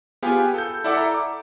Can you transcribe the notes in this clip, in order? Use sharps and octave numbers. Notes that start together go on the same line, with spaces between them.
B3 F4 G4 G#4 B4 G#5
A4 G6
E4 A4 D5 E5 F#5 D6
A4 A#5
D6